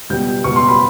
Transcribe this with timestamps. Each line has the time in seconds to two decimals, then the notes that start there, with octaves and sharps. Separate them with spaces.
0.10 C#2 B2 G3 B3 G6
0.44 C#2 B2 G3 B3 C#6
0.56 C6
0.68 B5